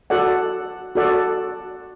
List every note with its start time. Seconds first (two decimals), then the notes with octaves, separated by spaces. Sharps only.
0.10 F#4 A4 D5 F#5
0.95 F#4 A4 D5 F#5